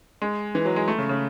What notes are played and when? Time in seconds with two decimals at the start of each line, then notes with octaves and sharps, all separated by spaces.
0.22 G#3
0.55 E3
0.65 F#3
0.76 G#3
0.88 A3
0.98 C#3
1.09 C#3